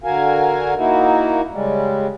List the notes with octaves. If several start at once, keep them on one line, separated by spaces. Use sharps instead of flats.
D3 F#4 A#4 F5 G#5
A#3 D#4 E4 F#4
C#3 G3 G#3